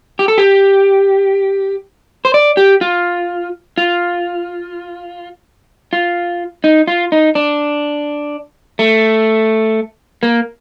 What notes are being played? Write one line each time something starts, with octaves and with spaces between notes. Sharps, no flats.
G4
A4
G4
C5
D5
G4
F4
F4
F4
D#4
F4
D#4
D4
A3
A#3